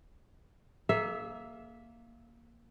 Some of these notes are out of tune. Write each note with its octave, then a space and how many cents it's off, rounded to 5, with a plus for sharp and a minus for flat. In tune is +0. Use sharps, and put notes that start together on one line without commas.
A#3 +0 G#4 +45 E5 +0